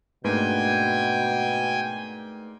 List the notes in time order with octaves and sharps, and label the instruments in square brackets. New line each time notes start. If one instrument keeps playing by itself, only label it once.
[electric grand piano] G#2 A#3 D4 [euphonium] B2 [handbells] A3 B4 [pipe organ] G5 G#5